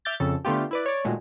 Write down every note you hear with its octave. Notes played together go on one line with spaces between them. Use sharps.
E5 D6 F6 G6 A6
F2 C#3 A4
D3 A3 B3 F4 G4
E4 B4 D5
C#5 D5
A#2 D#3 F#3 G#3 A3